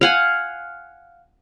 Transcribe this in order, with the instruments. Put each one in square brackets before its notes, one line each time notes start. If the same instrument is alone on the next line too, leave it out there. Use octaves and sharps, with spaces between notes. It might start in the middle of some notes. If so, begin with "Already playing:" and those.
[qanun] F5 F#5 G#5